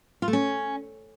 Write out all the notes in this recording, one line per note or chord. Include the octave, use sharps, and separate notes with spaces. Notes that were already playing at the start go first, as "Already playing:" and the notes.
F4
A3
C#4